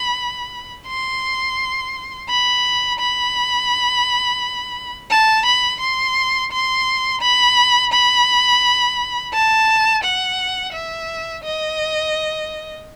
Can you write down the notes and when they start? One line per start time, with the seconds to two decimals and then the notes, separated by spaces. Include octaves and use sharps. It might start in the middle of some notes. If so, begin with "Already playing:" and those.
Already playing: B5
0.88 C6
2.29 B5
3.00 B5
5.11 A5
5.45 B5
5.81 C6
6.52 C6
7.22 B5
7.93 B5
9.33 A5
10.04 F#5
10.73 E5
11.44 D#5